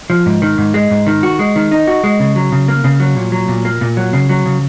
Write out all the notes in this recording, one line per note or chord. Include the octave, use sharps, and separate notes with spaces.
F3
G#2
D#3
G#2
G#3
G#2
D#3
F#4
G#3
D#3
D#4
F#4
G#3
C#3
F#3
C#3
A#3
C#3
F#3
A#2
F#3
A#2
A#3
A#2
F#3
C#3
F#3
C#3